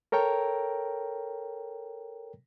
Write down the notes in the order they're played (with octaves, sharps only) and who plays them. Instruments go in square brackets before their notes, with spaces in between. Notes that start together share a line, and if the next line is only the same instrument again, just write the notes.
[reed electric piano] A4 A#4 C#5 G5 A#5